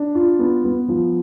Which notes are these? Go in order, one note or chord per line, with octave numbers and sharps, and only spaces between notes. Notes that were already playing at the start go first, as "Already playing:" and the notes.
Already playing: D4
F4
B3
B3
F3